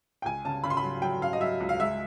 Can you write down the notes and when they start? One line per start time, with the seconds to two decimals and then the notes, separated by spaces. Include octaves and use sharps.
0.22 G5
0.25 C#2 G#5
0.45 C#3 A5
0.64 C#3 B5
0.70 C6
0.77 B5
0.84 F#3
1.02 F#3 G5
1.21 C#3 F5
1.33 D#5
1.40 F#3 E5
1.60 C#2
1.69 F5
1.79 G#3 E5